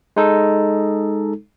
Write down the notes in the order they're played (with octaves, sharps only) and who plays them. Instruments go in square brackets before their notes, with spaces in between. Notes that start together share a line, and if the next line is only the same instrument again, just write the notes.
[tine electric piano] G#3 D#4 A4